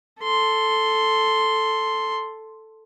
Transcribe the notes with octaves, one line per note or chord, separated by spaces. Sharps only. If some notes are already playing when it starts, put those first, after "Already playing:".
A4 C6